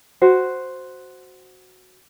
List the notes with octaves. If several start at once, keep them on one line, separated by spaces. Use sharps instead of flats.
F#4 C5